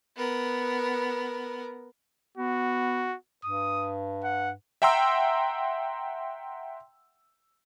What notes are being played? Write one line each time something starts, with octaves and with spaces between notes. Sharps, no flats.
B3 A#4
B3 F#4
G2 D#6
F#5
E5 F#5 G5 A#5 C6 E6